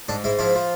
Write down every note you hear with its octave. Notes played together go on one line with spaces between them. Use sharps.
G#2 D4
G#2 E4
F3 E4
F3